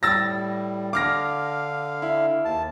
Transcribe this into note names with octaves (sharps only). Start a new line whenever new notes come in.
A2 G3 E6 A6 A#6
D3 F5 D6 F6 A#6
E4
D#2 A5